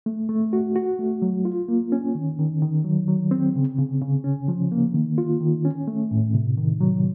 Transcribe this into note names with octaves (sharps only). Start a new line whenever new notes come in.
A3
A3
F#4
F#4
A3
F#3
F4
A#3
C#4
D#3
D#3
D#3
F#3
F#3
C4
C#3
C#3
C#3
C#4
F3
A#3
D#3
F4
D#3
C#4
A3
A2
C3
D#3
F#3